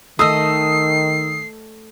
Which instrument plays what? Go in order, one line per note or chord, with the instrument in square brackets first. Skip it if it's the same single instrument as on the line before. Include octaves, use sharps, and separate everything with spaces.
[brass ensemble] D#3 [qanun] A3 D#5 [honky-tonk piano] D#6 E6 [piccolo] C7